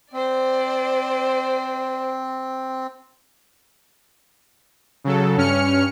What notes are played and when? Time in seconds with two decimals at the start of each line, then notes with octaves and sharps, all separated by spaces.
0.13 C4 C5 D5
5.04 C#3 F#3 A4
5.37 G2 C#4 F6 C#7